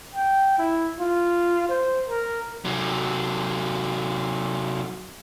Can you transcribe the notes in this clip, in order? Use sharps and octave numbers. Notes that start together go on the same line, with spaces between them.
G5
E4
F4
C5
A#4
C3 F#3